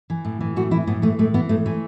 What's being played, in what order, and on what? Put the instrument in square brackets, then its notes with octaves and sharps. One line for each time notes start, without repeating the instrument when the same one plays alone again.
[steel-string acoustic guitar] E3
A2
E3
A2 F#4
E3 E4
A2 B3
E3 A3
A2 A3
E3 B3
A2 A3
E3 A3